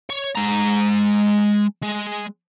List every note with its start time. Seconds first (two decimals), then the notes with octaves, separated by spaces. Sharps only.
0.10 C#5
0.36 G#3 A#5
1.83 G#3